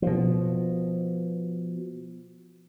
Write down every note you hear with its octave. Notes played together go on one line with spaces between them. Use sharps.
B2 F3